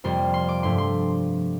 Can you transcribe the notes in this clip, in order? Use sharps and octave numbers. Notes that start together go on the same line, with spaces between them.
F2 C3 G3 A#3 C6
C6
D6
G2 F3 A3 C6
C6